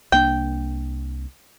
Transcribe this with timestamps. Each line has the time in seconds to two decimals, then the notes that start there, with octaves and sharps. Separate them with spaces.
0.12 C2 A#3 D4 G5